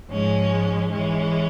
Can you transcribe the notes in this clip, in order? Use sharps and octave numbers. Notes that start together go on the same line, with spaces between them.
G#2 F3 G#3 C#4
E3 G#3 C#4